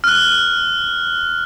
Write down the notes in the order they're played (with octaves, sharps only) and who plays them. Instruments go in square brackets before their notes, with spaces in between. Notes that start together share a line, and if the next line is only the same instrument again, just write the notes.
[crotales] F6 F#6